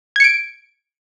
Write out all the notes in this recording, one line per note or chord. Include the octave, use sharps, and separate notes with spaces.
G#6 C#7 D7